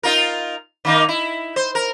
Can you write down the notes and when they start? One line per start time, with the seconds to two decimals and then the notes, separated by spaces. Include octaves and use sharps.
0.03 D#4 F4 A#4
0.85 D#3 A#3 D#4
1.09 E4
1.56 C5
1.75 A#4